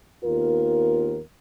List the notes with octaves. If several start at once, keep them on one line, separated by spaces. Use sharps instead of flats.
D#2 B3 F4 A#4